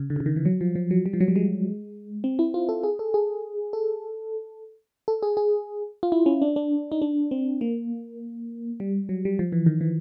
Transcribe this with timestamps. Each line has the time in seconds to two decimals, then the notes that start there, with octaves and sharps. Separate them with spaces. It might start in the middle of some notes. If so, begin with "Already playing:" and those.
Already playing: C#3
0.10 D3
0.16 C#3
0.20 D3
0.26 D#3
0.36 E3
0.45 F#3
0.61 F3
0.75 F3
0.91 F#3
1.06 G3
1.13 F3
1.20 F#3
1.28 G3
1.36 G#3
2.24 C4
2.39 E4
2.54 F4
2.69 A4
2.83 G#4
2.99 A4
3.14 G#4
3.73 A4
5.08 A4
5.23 G#4
5.37 G#4
6.03 F4
6.12 E4
6.26 C#4
6.42 D4
6.56 D4
6.92 D#4
7.02 D4
7.31 C4
7.61 A#3
8.80 G3
9.09 F#3
9.25 G3
9.39 F3
9.52 E3
9.66 D#3
9.81 E3